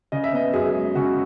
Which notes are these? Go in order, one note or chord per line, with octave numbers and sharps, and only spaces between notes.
C#3 D#5
E5
B3 D#5
F#2 G#4
G#3
C#3 F#4